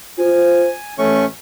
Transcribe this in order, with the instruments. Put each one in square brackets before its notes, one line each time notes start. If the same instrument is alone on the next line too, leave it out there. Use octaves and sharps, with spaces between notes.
[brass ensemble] F4 C5 [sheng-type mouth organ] G#5
[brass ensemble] A1 [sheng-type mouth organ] A3 C#4 C#6